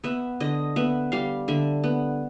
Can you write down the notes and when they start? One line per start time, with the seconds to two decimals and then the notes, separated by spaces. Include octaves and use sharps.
0.04 B3 E5
0.40 D3 D#5
0.76 B3 E5
1.12 G3 F5
1.48 D3 E5
1.84 B3